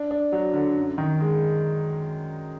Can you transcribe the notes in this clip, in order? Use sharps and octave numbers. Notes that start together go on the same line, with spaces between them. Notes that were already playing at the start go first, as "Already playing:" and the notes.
Already playing: D4
D4
F#3
D3
F#2
D#3
G#3